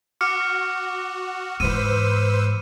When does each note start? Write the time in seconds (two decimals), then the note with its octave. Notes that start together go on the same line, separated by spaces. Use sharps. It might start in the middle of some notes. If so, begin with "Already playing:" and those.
0.21 F#4 D6 F6 C#7
1.60 G#2 E3 B4 C5 E6 D#7